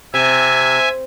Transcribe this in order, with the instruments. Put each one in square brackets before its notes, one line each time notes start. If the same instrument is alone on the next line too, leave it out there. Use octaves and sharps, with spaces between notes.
[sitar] C3 [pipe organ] E5 G#5